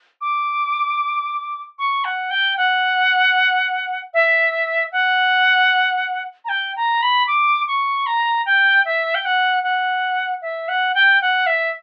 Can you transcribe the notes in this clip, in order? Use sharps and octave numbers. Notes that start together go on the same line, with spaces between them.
D6
C#6
F#5
G5
F#5
E5
F#5
A#5
G5
A#5
B5
D6
C#6
A#5
G5
E5
G5
F#5
F#5
E5
F#5
G5
F#5
E5